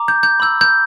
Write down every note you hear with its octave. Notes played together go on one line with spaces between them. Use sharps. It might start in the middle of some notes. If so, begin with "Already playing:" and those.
Already playing: A#5 D6
G6
G6
B5 E6 G6
G6